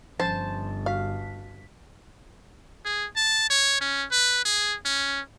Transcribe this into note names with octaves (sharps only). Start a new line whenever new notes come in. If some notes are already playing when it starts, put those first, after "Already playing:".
G1 F3 C#4 C5 A5 A6
F#4 F5 B6
G#4
A5
C#5
C#4
B4
G#4
C#4